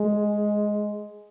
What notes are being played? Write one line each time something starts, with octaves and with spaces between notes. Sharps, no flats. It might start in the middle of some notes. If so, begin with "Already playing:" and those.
Already playing: G#3